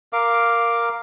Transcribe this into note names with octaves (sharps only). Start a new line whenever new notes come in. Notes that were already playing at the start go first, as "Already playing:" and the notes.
A#4 F5 D6